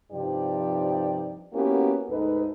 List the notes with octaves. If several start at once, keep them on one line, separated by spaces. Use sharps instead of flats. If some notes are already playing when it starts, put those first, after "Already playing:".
G2 C3 F3 D#4 G4 D5
A#3 B3 C#4 E4 F#4 G4
D2 G#2 D#4 A4 B4